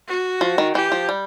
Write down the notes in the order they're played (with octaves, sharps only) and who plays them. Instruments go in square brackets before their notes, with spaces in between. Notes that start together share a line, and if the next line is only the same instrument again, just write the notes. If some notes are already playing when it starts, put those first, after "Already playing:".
[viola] F#4
[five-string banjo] F3
D#3
[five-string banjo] E3 [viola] G4
[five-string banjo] F3
G3